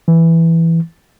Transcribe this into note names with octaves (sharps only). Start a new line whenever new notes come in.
E3